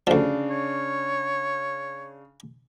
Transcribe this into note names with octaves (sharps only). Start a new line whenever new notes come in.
D2 C#3 F3 D4
C#5